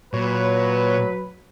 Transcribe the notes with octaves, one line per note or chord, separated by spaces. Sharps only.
A#2 F#3 B4 C#5